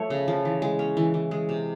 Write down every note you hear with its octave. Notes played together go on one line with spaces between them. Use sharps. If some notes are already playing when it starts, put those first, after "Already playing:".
Already playing: F3 A3 C#5
C#3
F3
E3
G#3
C#4
E3
E3
G#3
C3